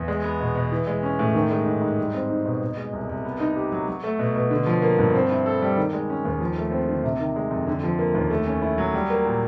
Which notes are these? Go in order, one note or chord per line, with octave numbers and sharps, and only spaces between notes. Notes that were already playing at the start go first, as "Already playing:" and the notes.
Already playing: E2
G#3
B3
B2
B2
E3
G#3
C#4
A2
D#3
G#3
G#2
G#2
G3
C4
D#4
B2
B2
G#3
C2
C2
B3
D#4
G4
F#3
F#3
A3
B2
B2
D3
F3
A#3
G2
C4
E4
A4
G3
D#3
G#3
C#4
D#2
F3
A3
C4
D3
C3
D#3
G#3
F2
D3
F3
A#3
D#2
A3
C#4
E4
F#3
G3
A#3
A#2